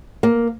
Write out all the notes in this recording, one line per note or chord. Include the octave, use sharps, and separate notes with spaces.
A#3